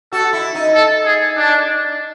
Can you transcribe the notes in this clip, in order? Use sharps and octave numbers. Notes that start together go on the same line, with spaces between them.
F#4 A4
E4
D#4
A4
G#4
D4